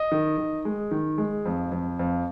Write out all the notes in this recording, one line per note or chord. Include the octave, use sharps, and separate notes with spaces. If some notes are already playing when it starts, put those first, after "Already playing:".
Already playing: D#5
D#3
D#3
G#3
D#3
G#3
F2
F2
F2